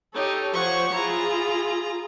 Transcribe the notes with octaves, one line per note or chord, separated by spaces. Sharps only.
D#4 G4 A4 C#5
F3 C5 C#5 F#5 C#6
E4 F4 G#4 A#5